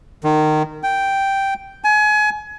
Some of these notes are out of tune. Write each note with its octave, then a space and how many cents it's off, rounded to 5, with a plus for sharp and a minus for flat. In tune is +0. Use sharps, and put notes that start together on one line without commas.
D#3 -20
G5 -5
G#5 +30